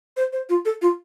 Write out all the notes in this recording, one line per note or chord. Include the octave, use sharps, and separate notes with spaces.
C5
C5
F4
A4
F4